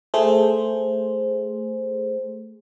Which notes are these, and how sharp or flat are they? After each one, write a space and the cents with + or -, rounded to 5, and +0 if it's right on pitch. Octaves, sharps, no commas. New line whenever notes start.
A3 +0 G#4 +0 C5 +0